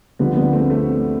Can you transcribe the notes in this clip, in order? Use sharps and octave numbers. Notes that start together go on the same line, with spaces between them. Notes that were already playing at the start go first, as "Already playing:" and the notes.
D2 D3 F3 G3 B3
G3 B3
A3 C4
A3 C4